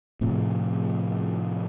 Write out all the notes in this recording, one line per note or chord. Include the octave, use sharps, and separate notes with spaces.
A2 C3 F3